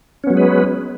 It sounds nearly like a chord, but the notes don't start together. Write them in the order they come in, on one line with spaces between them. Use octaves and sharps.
C#4 B3 F#3 G#3 B4